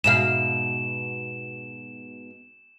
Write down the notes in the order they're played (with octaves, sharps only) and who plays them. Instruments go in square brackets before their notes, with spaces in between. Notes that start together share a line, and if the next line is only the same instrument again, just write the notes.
[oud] G#2 B2 F5 [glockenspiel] E7